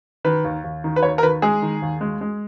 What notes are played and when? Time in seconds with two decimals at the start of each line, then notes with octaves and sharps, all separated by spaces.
0.24 D#3 B4
0.44 D#2
0.64 D#2
0.84 D#3
0.96 B4
1.03 D#2 C#5
1.18 A#4
1.23 D#3 B4
1.42 G#3 G#4
1.62 D#3
1.82 D#2
2.01 G#3
2.21 G#3